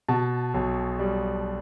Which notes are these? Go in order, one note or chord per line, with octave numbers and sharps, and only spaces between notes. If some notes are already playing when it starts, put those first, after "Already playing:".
B2 A5
B1
G3